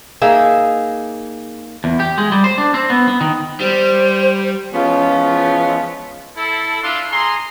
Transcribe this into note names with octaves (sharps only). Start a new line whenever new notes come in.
A#3 D#4 G#4 E5
E2
G4
G#3
G3
C5
D4
C4
B3
B3
D#3
G3 C5
E3 F3 G#3 B3 C#4 F4
E4 A4
D4 E4 F4 E5 C6
G#4 A#5 C6